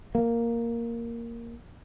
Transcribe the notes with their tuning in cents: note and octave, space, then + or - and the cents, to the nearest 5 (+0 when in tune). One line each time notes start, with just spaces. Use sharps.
A#3 +0